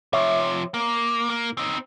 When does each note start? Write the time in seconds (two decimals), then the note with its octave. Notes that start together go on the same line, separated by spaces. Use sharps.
0.13 C3 F3 C#5 E5
0.74 A#3
1.30 A#3
1.58 C4 D#4